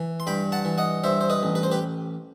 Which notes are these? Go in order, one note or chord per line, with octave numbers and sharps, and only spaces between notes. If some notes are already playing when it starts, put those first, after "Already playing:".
Already playing: E3
C6
G2 G5 B5
F#5 A5
E3
D#5 F#5
G2 C5 E5
C5
B4 D#5
A1
B4
C5
G4 B4